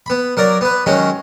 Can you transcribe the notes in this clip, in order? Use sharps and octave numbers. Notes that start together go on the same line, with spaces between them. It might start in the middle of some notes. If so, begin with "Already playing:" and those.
B3 B5
F#3 A#4 D5
B3 B4
D#3 F#3 G#3 C#4